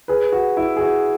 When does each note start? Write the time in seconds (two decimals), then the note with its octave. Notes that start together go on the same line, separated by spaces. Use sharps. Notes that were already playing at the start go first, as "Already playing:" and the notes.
0.08 G#4 B4
0.32 F#4
0.57 E4
0.77 G#4
0.81 F#4